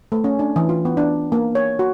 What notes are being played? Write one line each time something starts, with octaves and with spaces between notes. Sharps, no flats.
A3
C#4
D4
E3
F4
B3
D4
A#3
C#5
F#4